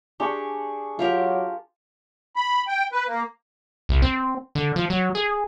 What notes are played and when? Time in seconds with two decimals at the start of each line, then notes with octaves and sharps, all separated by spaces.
0.20 D4 G4 G#4 C#6
0.99 F#3 F4 G4 A#4
2.36 B5
2.67 G5
2.92 B4
3.07 A#3
3.89 C2
4.02 C4
4.55 D3
4.76 F3
4.90 F#3
5.15 G#4